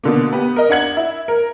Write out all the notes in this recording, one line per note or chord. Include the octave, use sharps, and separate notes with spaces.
B2 D3 A#3
B3 G4
A#4 D#5
D4 F#5 G#6 F#7
E4
A#4